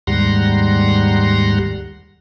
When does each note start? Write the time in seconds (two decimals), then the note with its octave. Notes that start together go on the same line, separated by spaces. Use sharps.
0.07 D#2 G#2 G3 F#5 A#5 C6